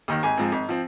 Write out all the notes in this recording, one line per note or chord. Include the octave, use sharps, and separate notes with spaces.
D#2 D#3
G#1 G#5
G#2 F3 C4
G#1
F3 C4